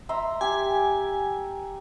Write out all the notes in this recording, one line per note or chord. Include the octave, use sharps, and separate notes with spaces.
E5 A#5 C6
G4 G#5